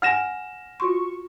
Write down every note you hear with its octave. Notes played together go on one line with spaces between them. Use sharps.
F#5 G#5 F6 A#6 E7
F4 F#4 C6 C#6